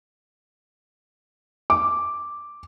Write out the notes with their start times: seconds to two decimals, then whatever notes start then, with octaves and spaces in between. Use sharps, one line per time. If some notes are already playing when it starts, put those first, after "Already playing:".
1.70 D6